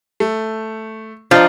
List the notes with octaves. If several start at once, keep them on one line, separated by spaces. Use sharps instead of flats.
A3
F3 D4 D#5 A#5